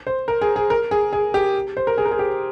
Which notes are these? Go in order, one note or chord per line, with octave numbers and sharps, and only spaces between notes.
C5
A#4
G#4
G#4
A#4
G#4
G#4
G4
C5
A#4
G#4
A#4
G#4
G4